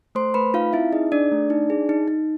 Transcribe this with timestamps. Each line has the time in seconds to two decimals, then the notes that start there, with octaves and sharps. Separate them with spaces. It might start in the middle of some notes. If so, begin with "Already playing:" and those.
0.15 A3 C5 C6
0.34 A3 B4 B5
0.54 D#4 F4 F5
0.73 C4 E4 E5
0.92 D#4 G#4 D#5
1.12 D4 G#4 D5
1.31 A3
1.50 D#4
1.70 G#4
1.89 D#4
2.08 D#4